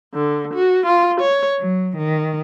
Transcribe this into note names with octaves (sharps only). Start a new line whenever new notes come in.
D3
F#4
F4
C#5
F#3
D#3